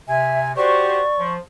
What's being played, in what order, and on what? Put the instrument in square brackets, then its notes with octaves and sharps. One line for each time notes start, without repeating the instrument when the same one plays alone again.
[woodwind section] C3 [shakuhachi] E5 [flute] G#5
[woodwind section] F#4 G4 C5 [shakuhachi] D5 [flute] C#6
[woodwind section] F3